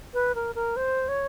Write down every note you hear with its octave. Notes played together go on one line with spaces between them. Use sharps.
B4
A#4
A#4
C5
C#5